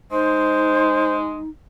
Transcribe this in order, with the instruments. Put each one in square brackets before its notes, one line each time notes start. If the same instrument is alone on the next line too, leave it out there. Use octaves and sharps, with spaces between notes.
[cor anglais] G#3 [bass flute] D#4 [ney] C5